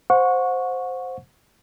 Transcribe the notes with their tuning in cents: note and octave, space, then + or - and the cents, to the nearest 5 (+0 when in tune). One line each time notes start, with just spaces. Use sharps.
C5 +0 F#5 -35 C#6 +0